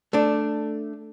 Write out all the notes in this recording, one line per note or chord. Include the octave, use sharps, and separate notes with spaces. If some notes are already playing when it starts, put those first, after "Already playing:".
A3 D4